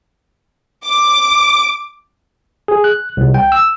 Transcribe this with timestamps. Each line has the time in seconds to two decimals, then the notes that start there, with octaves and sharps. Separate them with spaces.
0.84 D6
2.68 G#4
2.84 F#6
3.17 C2
3.34 G5
3.52 E6